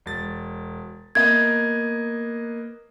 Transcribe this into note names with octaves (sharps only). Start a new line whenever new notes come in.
E1 A6
A#3 B3 D#5 G#6